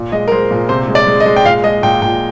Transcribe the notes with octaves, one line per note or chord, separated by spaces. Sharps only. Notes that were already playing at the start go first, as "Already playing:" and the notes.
Already playing: A#2
G#3 D#5
A#4
G#3 C5
A#2
C3 C5
G#3
D5
G#3
D#5
G#3
G5
A#2 F5
G#3 D#5
A#2 G5
A#2 G5